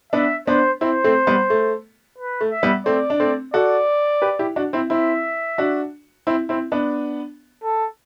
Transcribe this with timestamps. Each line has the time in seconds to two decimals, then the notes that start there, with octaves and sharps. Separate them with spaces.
0.13 B3 D4 E5
0.47 B3 D4 C5
0.81 C4 E4 C5
1.04 A3 C4
1.27 G3 B3
1.50 A3
2.18 B4
2.41 A3
2.51 E5
2.63 G3 B3
2.86 A3 C4 D5
3.10 D4
3.20 A3 C4
3.54 F#4 A4 D5
4.22 G4 B4
4.39 E4 G4
4.56 D4 F#4
4.73 C4 E4
4.90 C4 E4 E5
5.58 D4 F#4
6.27 C4 E4
6.49 C4 E4
6.72 B3 D4
7.63 A4